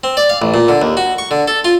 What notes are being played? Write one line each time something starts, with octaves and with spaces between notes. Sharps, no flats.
C4
D5
F5
A1
A#2
D3
D#2
F#4
C#6
D3
A4
F4